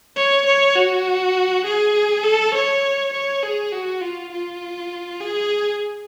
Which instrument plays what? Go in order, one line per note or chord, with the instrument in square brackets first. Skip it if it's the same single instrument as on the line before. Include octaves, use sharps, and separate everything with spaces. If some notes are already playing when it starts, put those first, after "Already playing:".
[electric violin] C#5
C#5
F#4
G#4
A4
C#5
C#5
G#4
F#4
F4
F4
G#4